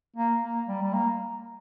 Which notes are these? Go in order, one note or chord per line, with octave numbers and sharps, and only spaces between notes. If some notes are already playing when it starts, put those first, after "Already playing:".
A#3
A#3
G3
G3
A#3